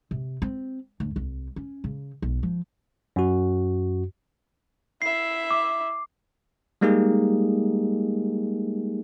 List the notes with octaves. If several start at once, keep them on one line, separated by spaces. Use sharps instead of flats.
C3
C4
D2
C2
C#4
C#3
B1
F3
F#2 F#4
E4 E5 C7
D6
G3 G#3 A#3 D#4 G4 G#4